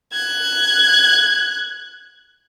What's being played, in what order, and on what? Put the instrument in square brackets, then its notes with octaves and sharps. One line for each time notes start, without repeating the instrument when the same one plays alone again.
[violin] F#6 G#6